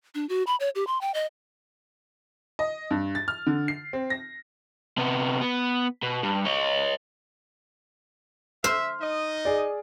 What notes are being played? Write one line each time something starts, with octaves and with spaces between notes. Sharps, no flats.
D4
F#4
B5
C#5
G4
C6
G5
D#5
D#5
G2
A6
F6
D3
C7
C4
A#6
C3 B3
B3
B2
G2
C#5 D#5
C5 E5 F6
D#4 D#5
G#4 D5